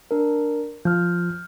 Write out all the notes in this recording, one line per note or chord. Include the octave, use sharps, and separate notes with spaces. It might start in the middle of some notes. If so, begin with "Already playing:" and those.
D4 A#4
F3 F6 G6